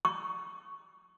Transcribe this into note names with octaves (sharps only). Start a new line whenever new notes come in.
C#6